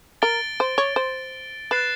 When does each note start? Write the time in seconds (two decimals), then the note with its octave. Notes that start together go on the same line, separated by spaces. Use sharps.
0.22 A#4 A6 D7 G7
0.60 C5
0.78 C#5
0.96 C5
1.71 B4 F#6 A6 C7 E7